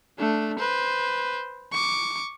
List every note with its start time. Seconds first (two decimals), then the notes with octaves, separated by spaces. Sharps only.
0.18 A3 D4
0.59 B4 C5
1.72 C#6 D6